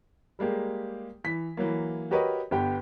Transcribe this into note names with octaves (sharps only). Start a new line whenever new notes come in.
G3 G#3 A#3 G4
E3 B6
E3 F#3 A#3
F#4 G4 A#4 B4 C#5 D#5
G1 B3 G4 G5